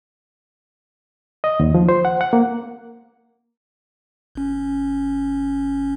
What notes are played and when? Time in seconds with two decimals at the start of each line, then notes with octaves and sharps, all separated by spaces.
1.44 D#5
1.60 D#2
1.74 F3
1.89 C5
2.05 F#5
2.21 F#5
2.33 A#3
4.35 G1 C#4